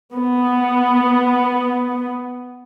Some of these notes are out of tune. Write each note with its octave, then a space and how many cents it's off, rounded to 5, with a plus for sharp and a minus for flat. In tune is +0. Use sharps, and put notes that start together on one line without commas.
B3 +5